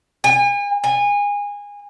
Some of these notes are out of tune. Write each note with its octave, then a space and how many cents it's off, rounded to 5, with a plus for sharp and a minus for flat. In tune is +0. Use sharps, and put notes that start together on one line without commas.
G#5 -40
G#5 -25